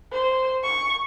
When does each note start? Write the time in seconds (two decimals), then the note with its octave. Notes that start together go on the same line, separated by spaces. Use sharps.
0.12 C5
0.64 C#6